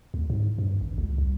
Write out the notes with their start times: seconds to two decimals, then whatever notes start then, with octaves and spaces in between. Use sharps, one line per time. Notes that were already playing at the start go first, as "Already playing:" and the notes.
0.14 D2
0.30 G#2
0.58 G2
0.81 G#1
0.98 C#2
1.18 C2